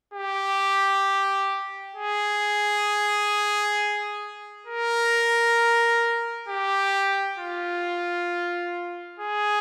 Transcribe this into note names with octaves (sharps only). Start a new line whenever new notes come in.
G4
G#4
A#4
G4
F4
G#4